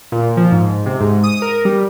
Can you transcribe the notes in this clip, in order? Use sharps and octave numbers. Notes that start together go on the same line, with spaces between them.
A#2
F3
G#2
C3
G#2
D#6
A#4
G3